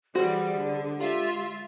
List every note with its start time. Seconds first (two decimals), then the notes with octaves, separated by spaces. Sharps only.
0.15 E3 G3 F#4 G#4 C5
0.55 D3
0.98 G#3 F4 G4 E5